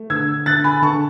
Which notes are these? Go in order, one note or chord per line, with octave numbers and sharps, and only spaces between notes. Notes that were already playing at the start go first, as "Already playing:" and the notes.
Already playing: A3
D3 E6 G#6
D3 F#6 A6
G#5 B5
D3 A5 C#6